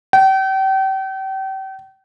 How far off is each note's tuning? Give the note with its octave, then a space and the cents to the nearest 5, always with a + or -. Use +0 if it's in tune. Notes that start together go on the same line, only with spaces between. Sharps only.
G5 -35